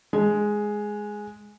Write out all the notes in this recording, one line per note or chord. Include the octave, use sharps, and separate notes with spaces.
G#3